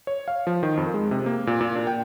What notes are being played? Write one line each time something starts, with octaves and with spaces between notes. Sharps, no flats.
C#5
F5
F3
D#3
F2
G#3
C3
A#3
A#2
A#2
D4
G5